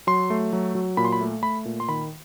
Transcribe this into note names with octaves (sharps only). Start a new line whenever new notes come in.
F#3 C6
A3
F#3
F#3
A#2 B5
C6
B5
A3
A3 B5
A#2
C6
D#3 B5